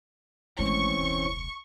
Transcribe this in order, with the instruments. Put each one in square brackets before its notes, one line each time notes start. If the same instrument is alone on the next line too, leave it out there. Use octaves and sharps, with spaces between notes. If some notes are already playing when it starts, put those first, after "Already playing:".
[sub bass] G#1 [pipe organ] E3 C4 C#4 [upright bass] G#3 A3 [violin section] C#6
[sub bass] E1 [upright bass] C#2